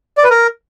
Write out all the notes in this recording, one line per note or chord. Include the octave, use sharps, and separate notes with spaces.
D5
B4
A#4